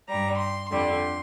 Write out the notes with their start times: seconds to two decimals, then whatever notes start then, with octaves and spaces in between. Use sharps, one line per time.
0.09 G2 G3 A#5
0.40 C6
0.71 F2 D3 G3 C6